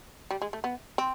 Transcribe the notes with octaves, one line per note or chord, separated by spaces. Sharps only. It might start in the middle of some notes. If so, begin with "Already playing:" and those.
G3
G#3
A3
B3
C4